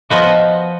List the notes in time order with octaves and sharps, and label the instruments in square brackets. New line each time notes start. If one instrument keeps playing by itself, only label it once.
[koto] F3 B3 F#4 [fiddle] D#5